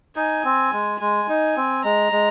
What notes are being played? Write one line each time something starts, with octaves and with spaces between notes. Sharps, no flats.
D#4 G#5
C4
G#3
G#3 G#5
D#4
C4
G#3 A#5
G#3